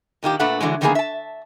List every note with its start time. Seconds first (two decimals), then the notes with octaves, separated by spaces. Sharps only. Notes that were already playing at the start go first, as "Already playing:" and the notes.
0.23 A#2 D#3 A#3 G4
0.39 A#2 A3 D4 B4 F#5
0.61 D3 E3 F#3 G#3
0.81 D3 D#3 F3 A#3 B3 G#4
0.95 E5 A5